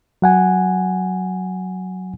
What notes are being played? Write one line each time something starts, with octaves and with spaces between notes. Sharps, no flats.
F#3 F#5 G#5